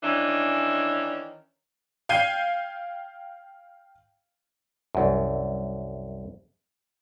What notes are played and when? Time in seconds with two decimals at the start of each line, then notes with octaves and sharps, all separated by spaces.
0.03 D#3 E3 C#4 D4
2.09 F5 G5 G6 G#6 C7 D#7
4.95 C2 F#2